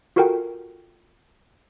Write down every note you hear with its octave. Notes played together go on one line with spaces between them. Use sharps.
F4 F#4 A4 A#4 F#5 G5